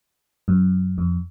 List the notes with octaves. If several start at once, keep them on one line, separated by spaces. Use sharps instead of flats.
F#2
F2